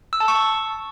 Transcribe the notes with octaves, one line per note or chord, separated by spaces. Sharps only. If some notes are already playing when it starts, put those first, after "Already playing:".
E6
A5
C#6